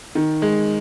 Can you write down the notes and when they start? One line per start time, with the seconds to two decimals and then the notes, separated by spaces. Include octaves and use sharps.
0.15 D#3
0.42 G#3